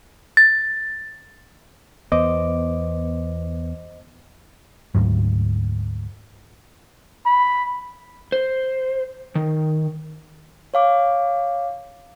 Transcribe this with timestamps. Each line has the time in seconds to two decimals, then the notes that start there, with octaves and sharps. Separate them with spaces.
0.37 A6
2.12 E2 B3 C5 D#5 D6
4.95 D2 G#2 F#3
7.26 B5
8.32 C5
9.35 D#3
10.74 C#5 F5 D6